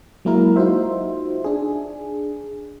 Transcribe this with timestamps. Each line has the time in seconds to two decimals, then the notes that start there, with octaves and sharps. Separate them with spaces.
0.25 F#3 G#3 A#3 E4 A#4
0.56 D#4 F4 F#4 C5 E5
1.44 D4 G#4